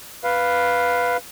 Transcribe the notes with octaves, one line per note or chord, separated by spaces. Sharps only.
B4 F5